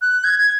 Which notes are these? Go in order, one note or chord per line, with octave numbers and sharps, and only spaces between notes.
F#6
G#6
G#6